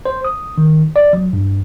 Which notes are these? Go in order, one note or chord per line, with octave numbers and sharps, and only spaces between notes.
C5
D#6
D#3
D5
F#3
G2